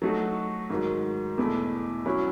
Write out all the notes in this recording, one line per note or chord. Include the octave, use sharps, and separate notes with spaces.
F#3 A3 D#4 F#4
G#2 D#3 F#3
E2 B2 A3 E4
F#3 C#4 E4